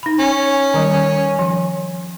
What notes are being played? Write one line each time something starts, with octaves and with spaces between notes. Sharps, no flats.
D#4 B5
C#4
D#3 G3
F3